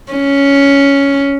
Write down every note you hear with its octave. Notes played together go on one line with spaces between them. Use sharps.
C#4